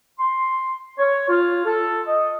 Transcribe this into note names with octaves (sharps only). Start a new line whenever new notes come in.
C6
C#5
F4
A4
D#5